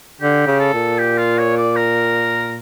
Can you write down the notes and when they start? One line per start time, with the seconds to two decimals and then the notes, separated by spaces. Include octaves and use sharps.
0.21 D3 G4
0.47 C#3
0.60 A4
0.74 A#2
0.98 G4
1.18 F4
1.39 C#5
1.57 D5
1.76 A#4